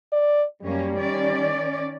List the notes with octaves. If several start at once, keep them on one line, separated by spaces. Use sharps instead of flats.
D5
F#2 G3 A#3 C#4
D#3 C#4 D5